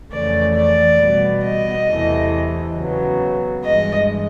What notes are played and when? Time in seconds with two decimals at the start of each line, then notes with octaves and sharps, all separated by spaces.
0.12 F2 C#3 E3 A3 D5
0.56 D5
1.00 B2 G3 B3
1.44 D#5
1.88 E2 C3 E3 A3
2.77 C#3 F#3 B3
3.64 G2 E3 G#3 D#5